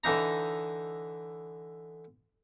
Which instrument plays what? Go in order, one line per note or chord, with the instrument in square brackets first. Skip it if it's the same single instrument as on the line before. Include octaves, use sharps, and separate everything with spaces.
[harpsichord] D3 E3 D#4 A#5